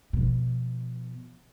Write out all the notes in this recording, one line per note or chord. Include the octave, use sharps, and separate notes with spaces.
B2 F3